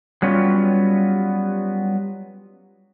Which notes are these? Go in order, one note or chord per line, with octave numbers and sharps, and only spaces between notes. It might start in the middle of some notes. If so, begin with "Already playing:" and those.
F#3 G3 B3 C#4 F4